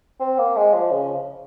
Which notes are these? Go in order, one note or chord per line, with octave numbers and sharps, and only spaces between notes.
C4
A#3
G#3
F3
C#3